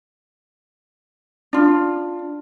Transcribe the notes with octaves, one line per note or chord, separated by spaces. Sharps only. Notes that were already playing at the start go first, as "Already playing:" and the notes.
D4 F4